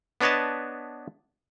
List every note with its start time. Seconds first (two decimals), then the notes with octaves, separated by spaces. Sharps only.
0.21 B3 D4 B4 C#5 D#5 A5